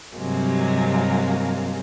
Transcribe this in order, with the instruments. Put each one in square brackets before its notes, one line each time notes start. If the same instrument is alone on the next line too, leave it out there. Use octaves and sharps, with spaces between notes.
[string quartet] G2 C3 F#3 G#3 A#3